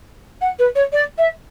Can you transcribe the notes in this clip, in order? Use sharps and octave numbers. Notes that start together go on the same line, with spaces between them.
F#5
B4
C#5
D5
E5